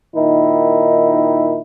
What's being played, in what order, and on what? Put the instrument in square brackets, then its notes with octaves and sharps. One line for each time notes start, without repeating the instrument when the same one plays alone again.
[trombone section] A#2 D#3 D#4 E4